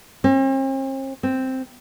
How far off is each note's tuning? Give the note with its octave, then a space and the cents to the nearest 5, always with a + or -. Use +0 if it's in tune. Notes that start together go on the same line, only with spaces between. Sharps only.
C4 +45
C4 +0